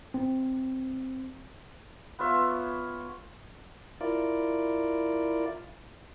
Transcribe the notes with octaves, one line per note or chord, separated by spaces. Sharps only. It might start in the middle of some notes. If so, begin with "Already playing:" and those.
C4
B3 F4 C#5 E5
E4 F4 A#4 D5